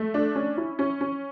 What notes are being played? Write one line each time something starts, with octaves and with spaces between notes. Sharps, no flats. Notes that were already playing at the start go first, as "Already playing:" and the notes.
Already playing: A3
D4
C#4
E4
C#4
C#4